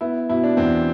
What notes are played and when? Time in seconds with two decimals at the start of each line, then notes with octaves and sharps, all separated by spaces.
0.01 B3 E4
0.30 B2 E4
0.44 D4
0.57 E2 C4